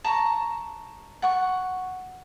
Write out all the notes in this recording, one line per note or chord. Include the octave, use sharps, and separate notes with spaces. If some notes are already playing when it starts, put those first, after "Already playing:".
A5 A#5 C#6
F#5 C#6